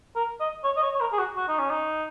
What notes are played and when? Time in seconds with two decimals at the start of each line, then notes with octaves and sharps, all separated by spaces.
0.16 A#4
0.40 D#5
0.64 C#5
0.76 D#5
0.82 C#5
0.94 C#5
1.00 A#4
1.12 G#4
1.18 F#4
1.37 F#4
1.48 D#4
1.59 C#4
1.70 D#4